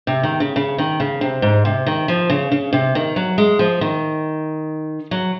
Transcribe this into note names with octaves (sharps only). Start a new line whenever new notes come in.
C3
D#3
C#3
C#3
D#3
C#3
C3
G#2
C3
D#3
F3
C#3
C#3
C3
D#3
F#3
G#3
F3
D#3
F#3